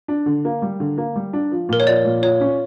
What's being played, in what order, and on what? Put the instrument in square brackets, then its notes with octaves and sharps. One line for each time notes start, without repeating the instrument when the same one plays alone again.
[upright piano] D4
D3
A#3
G3
D3
A#3
G3
D4
F3
[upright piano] A#2 [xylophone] A#4
[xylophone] C#5
[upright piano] F3 [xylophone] D5
[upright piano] A#2
[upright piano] F4 [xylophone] C#5
[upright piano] C#4